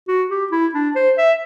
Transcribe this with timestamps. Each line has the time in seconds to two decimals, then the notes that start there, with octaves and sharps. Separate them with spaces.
0.08 F#4
0.30 G4
0.52 E4
0.74 D4
0.95 C5
1.18 E5